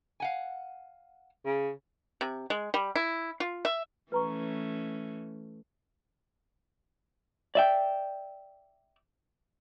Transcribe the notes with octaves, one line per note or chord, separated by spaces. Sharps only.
F5 F#5 G#5
C#3
C3
G#3
G3
E4
F4
E5
E3 A3 C#4 B4 A#5 C#6
D5 E5 G5